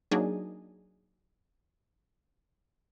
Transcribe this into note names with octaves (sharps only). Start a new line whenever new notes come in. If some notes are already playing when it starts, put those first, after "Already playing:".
F#3 A#3 D4 D#4 G#4